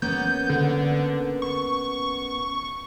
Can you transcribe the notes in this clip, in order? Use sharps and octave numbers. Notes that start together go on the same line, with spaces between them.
A#3 B3 C#4 G6
D3
C#6